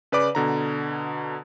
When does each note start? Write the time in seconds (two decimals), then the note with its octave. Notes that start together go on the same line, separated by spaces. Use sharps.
0.12 C#3 B4 D5 D6
0.35 B2 D3 A#5